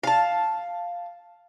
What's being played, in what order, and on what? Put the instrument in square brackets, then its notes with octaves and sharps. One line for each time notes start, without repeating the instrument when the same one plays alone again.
[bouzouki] F5 A5